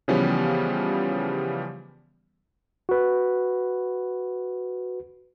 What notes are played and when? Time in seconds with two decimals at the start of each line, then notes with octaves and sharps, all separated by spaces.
0.08 C#3 E3 F3 G3 B3 C#4
2.89 F#4 B4